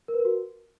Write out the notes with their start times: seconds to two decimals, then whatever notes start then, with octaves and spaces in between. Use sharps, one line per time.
0.08 A#4
0.14 B4
0.19 A#4
0.25 F#4